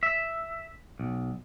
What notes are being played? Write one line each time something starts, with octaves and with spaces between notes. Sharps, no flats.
E5
B1